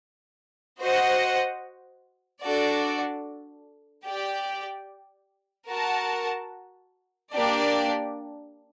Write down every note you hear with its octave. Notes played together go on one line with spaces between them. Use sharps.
F#4 C5 D#5 F#5
D4 F#4 A4 D5
G4 D5 G5
F#4 A#4 F#5 A5
A#3 D4 G4 D5